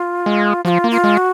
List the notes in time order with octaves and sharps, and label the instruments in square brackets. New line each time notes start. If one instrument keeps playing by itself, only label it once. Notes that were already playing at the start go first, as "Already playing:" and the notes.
Already playing: [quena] F4
[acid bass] G#3
[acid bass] F3 [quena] F#4
[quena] F4
[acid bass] A#3
[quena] F4
[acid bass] G#3
[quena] F#4